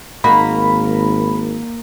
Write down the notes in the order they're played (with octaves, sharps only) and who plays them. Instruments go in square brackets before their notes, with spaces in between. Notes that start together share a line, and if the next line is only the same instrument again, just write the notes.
[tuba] G#1 [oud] A#3 D#4 F#4 [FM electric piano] B5